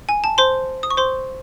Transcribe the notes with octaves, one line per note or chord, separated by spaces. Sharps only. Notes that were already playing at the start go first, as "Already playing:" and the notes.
G#5
A5
C5 C6
D#6
C#6
C5 C6